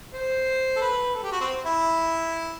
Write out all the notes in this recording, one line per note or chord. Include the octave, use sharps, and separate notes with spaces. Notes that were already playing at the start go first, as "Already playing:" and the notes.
C5
A4
B4
A4
G4
F#4
C4
E4